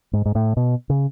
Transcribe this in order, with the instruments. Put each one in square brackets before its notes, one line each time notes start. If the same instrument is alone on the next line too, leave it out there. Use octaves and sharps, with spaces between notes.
[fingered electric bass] G#2
G#2
A2
B2
C#3